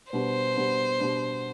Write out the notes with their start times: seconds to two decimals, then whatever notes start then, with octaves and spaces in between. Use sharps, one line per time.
0.12 B2 G3 B3 D4 C5
0.57 B2 G3 B3 D4
1.00 B2 G3 B3 D4